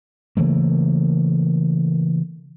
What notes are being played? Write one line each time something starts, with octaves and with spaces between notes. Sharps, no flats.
C#3 E3 A3 A#3